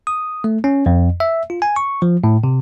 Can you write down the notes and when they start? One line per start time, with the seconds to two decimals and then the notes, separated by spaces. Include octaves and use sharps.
0.07 D#6
0.44 A3
0.64 C#4
0.86 F2
1.20 E5
1.50 F4
1.62 G#5
1.76 C#6
2.02 F3
2.24 A2
2.44 C3